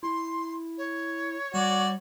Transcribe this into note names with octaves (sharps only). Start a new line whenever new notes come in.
E4 C6
C#5
G3 F#4 D5